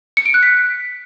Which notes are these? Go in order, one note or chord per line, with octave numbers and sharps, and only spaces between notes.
C#7
D7
F#6
B6